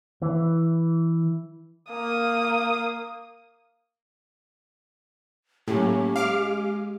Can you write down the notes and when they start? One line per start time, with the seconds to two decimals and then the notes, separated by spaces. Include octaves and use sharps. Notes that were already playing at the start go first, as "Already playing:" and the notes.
0.22 E3
1.92 A#3 D#6
5.68 A2 F#3 A#3 C#4 G4
6.16 G#3 F5 D6 F6